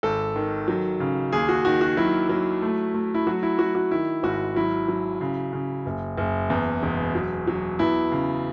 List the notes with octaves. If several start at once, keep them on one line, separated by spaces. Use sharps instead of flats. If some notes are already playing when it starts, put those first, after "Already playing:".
G#1 A4
D#3
F#3
C#3
D#2 G#4
F#4
D#3 F#4
F#4
F#3 E4
F#3
A3
A3
E4
F#3 F#4
E4
F#3 F#4
F#4
D#3 E4
G#1 F#4
F#3 E4
F#3
C#3
C#3
F#1
F#1
E2
E1
F#3
F#3
E2 E4
C#3